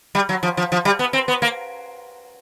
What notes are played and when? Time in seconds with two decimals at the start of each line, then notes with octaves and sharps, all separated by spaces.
0.15 G3
0.29 F#3
0.43 F3
0.57 F3
0.72 F3
0.85 G3
0.99 B3
1.13 C4
1.28 B3
1.42 A#3